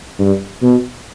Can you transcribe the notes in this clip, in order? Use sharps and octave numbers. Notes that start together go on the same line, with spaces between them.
G2
B2